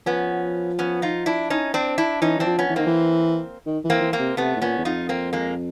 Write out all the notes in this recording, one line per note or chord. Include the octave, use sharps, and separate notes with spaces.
F3 B3 C#4
B3 C#4
D#4 F4
D4 E4
C#4 D#4
C4 D4
D4 E4
E3 C#4 D#4
E3 C4 D4
F3
B3 C#4
E3
D#3 A#3 C4
E3
D#3
E3
A#3 C4
E3
A#3 C4
C3
C3 A3 B3
A2
A#2 B3 C#4
E2
F2 D#4 F4
A#3 C4
G#3 A#3